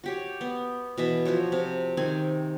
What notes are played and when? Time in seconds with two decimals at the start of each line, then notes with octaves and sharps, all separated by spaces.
0.04 F#4 G4 C#5
0.41 B3
0.98 B2 E3 E5
1.25 F3 F#4 C5 C#5
1.52 C3
1.97 D#3 C4 G#5